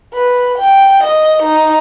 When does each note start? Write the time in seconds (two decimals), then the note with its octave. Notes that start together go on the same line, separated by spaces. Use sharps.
0.14 B4
0.58 G5
1.03 D#5
1.43 D#4